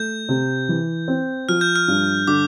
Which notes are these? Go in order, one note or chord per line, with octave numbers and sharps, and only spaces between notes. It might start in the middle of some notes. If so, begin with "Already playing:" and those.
Already playing: A3 G6
C3
E3
C4
F3 F6
G6
F6
G2
D3 D6